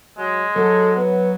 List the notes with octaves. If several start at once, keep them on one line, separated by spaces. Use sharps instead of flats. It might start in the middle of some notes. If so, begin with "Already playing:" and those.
F#3 G#3
F#3 A4
B3